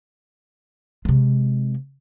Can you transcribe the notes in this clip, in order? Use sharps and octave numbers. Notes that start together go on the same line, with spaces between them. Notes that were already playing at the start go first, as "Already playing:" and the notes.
C3 G#3